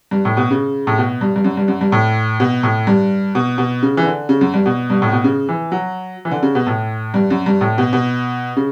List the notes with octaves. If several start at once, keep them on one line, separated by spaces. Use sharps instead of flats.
G2
A2
B2
C#3
A2
B2
G2
G2
F#2
G2
F#2
G2
A2
B2
A2
G2
B2
B2
C#3
E3
D3
C#3
F#2
G2
B2
G2
A2
B2
C#3
E3
F#3
E3
D3
C#3
B2
A2
G2
F#2
G2
A2
B2
B2
C#3